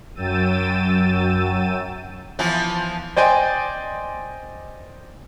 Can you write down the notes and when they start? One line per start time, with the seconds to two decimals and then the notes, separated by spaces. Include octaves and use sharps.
0.15 F#2 F#3 G5 E6 A6 D#7
2.39 E3 F3 B3
3.16 C5 D5 D#5 G5 G#5 C6